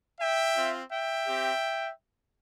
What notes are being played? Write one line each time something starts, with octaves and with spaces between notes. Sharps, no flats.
E5 G5
C4 F4
E5 G5
C4 G4